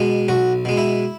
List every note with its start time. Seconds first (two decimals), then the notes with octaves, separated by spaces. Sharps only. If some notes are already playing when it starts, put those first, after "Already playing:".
Already playing: B2 G#3
0.28 B1 F#4
0.65 B2 G#3
0.77 E4